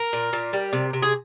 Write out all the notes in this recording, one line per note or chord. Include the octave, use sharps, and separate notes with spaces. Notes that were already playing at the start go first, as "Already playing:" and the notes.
Already playing: A#4
A#2
A#2
G3
C3
C3
G#4